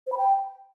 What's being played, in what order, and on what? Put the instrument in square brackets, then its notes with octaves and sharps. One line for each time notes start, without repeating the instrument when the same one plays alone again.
[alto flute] C5
B5
G5